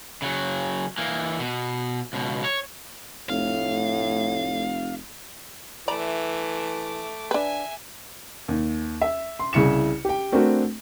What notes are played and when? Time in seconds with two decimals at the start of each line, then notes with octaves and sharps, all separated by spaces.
0.22 C#3 F#3
0.98 E3 A#3
1.40 B2
2.13 C#2 B2
2.44 C#5
3.30 F1 A2 F5
5.88 E3 A3 D5 A#5 B5 D6
7.31 D4 B4 E5 G#5
8.48 D#2
9.01 E5
9.39 C6
9.53 C2 C#3 E4 C#7 E7
10.05 G4 G5
10.32 A3 C4 D4 F#4 A#4